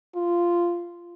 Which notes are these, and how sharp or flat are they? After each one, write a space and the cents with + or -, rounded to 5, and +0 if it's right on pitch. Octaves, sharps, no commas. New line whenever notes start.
F4 -10